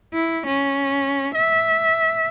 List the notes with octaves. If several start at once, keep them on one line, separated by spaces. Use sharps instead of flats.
E4
C#4
E5